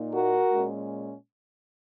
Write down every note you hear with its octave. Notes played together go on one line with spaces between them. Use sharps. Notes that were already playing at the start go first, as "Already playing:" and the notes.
Already playing: A#2 A#3 D#4
F#4 A#4
A#2 G#3 C#4